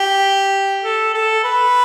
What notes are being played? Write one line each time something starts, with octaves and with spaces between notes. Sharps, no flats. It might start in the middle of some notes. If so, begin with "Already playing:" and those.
Already playing: G4
A4
A4
B4